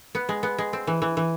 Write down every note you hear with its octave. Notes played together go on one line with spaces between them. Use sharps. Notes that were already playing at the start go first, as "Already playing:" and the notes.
B3
G#3
B3
G#3
C4
E3
E3
E3